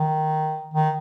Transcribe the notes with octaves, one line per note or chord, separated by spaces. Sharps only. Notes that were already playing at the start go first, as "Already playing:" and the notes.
Already playing: D#3
D#3